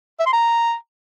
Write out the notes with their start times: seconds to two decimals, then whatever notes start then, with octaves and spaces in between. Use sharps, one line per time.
0.20 E5
0.26 C6
0.33 A#5